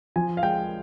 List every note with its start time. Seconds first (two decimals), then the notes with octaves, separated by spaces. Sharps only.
0.16 F3 G#5
0.37 F5
0.43 G#3 G5